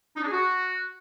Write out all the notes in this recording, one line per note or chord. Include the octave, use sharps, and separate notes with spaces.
D#4
D4
G#4
F#4